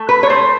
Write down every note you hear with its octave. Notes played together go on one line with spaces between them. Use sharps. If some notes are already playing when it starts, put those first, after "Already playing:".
Already playing: A3
B4
C#5
A3 C5